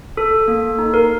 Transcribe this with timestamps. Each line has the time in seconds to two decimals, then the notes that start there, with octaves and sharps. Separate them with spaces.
0.17 A4
0.48 A#3
0.79 D#4
0.94 A#4